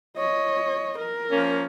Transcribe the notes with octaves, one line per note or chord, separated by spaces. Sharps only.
C#5 D#5
A#4
F3 A#3 C#4